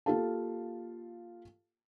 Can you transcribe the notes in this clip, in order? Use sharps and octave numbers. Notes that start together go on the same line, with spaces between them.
A#3 F4 G4 A4 F5 A5